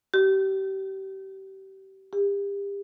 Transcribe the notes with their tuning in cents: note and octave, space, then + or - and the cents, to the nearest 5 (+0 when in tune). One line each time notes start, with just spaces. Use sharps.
G4 -30
G4 +35